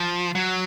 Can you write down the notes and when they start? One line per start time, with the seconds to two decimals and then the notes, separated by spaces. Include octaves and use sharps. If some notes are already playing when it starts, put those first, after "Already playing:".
Already playing: F3
0.35 F#3